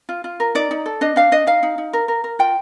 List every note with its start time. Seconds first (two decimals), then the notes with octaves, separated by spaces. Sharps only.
0.09 F4
0.24 F4
0.40 A#4
0.55 D#4 D5
0.71 D#4
0.86 A4
1.01 D4 D#5
1.16 D4 F5
1.32 D4 D#5
1.47 D#4 F5
1.63 D#4
1.78 D#4
1.93 A#4
2.08 A#4
2.24 A#4
2.39 F4 G5